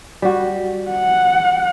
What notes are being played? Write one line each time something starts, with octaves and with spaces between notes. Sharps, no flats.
G3 F#4
F#5